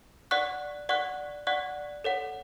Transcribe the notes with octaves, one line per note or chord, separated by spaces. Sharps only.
D5 F#5 C#6 F#6
D5 F#5 C#6 F#6
D5 F#5 C#6 F#6
A4 C#5 F#5